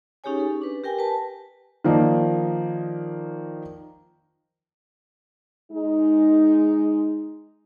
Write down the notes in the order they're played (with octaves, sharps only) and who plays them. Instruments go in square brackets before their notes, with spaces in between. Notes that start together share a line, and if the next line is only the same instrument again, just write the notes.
[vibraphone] C#4 D#4 G4 G#4 C#5 G#5
A4
D4 B4
G4 A#4 G5 G#5
B4 A5
[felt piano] D#3 F3 A#3 D5 D#5
[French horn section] G#3 D#4